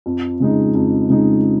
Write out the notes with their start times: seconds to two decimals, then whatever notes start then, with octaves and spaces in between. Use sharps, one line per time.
0.06 F2
0.40 C#3 G#3 D#4
0.75 F2
1.10 C#3 G#3 D#4